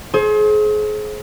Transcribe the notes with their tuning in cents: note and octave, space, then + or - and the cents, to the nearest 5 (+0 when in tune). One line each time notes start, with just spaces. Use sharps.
G#4 +35 C5 +30